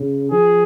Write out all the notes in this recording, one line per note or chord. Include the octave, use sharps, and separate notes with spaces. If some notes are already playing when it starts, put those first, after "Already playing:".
Already playing: C#3
F3 G#4